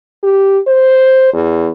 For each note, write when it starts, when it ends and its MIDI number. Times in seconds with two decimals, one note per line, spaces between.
0.23 0.59 67
0.67 1.30 72
1.34 1.70 40